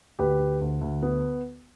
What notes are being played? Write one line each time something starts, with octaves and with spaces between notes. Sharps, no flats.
D2 G4 B4
D2
D2
D2
B3